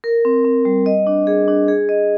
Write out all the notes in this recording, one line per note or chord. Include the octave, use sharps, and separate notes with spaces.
A#4
C4
C4
G3
D#5
D4
G#4
D4
G#4
D#5